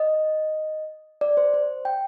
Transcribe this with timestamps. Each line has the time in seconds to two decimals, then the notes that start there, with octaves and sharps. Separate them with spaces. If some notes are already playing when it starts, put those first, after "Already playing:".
Already playing: D#5
1.21 D5
1.37 C5
1.54 C5
1.85 G5